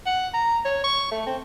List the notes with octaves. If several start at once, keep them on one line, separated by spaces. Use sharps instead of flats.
F#5
A#5
C#5
C#6
A3
C4